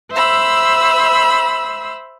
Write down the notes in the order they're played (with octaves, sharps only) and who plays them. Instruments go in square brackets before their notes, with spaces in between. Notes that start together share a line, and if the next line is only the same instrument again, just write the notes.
[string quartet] C5 E5 B5 E6